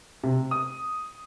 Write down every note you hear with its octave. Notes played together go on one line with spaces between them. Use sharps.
C3
D#6